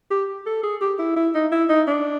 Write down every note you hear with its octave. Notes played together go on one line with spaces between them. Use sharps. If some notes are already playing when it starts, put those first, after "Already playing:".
G4
A4
G#4
G4
E4
E4
D#4
E4
D#4
D4